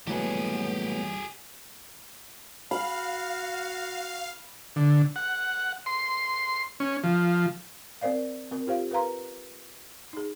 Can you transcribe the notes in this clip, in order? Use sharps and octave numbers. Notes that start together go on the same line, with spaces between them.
A2 E3 F#3 G3 A#3 B3 G4 G#4
F#4 F5 B5
D3
F#5
C6
C#4
F3
C4 A#4 C5 D5 F5
C4 A#4
F4 G4 C5 F5
A#4 B4 F5 A#5 C6
D#4 G#4